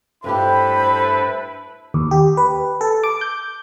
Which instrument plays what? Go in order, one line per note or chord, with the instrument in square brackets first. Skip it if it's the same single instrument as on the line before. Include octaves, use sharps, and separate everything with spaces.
[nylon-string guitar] G2 A3 G4 [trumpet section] E4 A4 B4 [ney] C5 [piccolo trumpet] B5
[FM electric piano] D#2
G4
B4
A4
D6
G6